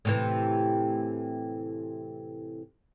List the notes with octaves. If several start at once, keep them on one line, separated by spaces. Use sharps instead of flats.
A2 C3 E3